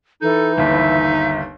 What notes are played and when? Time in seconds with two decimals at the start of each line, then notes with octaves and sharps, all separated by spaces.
0.22 E3 D#4 A4
0.58 G1 D#2 E5